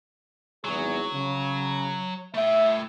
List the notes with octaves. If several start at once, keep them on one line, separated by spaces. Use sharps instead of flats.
G#1 E2 F#3 G#4
C#3
A3 E5 G5